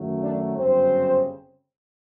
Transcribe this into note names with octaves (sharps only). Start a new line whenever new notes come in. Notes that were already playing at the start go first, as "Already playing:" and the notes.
Already playing: F#2 D#3 F#3 A3
D4 D5
G1 F#2 C#3 C4 C5